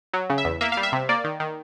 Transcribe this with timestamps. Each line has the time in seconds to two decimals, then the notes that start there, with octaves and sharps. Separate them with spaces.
0.13 F#3
0.30 C#3
0.38 E5
0.45 E2
0.61 A#3 E5
0.72 G3 F5
0.83 E5
0.92 C3
1.09 A#3 D5
1.24 D#3
1.40 D#3